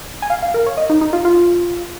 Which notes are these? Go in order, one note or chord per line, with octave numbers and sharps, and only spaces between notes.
G#5
F5
F5
A#4
C#5
D#5
D#4
D#4
F4
F4